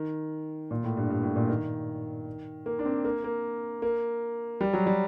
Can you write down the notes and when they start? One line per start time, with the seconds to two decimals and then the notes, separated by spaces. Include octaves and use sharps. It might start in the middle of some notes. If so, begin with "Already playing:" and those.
Already playing: D#3
0.71 A#2
0.84 A2
0.97 G2
1.10 G2
1.23 A2
1.36 A#2
1.49 D#3
2.66 A#3
2.79 D4
2.85 C4
3.05 A#3
3.24 A#3
3.82 A#3
4.61 G3
4.73 F#3
4.87 G3